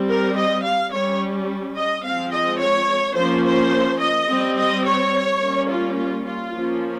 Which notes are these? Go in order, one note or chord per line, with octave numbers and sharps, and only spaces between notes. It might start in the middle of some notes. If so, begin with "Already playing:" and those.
Already playing: G3 C4
A#4
D#5
F5
G3 C#4 C#5
D#5
F3 G#3 C4 F5
D#5
C#5
F3 A#3 C#4 C5
C5
D#5
G3 C4
D#5
C#5
G3 A#3 C#4
F4
F4
F4
F3 A#3 C#4